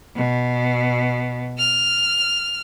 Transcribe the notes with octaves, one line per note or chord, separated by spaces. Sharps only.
B2
F6